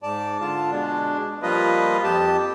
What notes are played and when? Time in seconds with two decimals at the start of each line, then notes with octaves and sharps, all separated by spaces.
0.03 G#2 D5 A5
0.41 D3 F4 A5
0.71 B2 G#3 D4
1.42 F3 G3 A#3 F4 B4 D#5
2.03 F2 G4 A5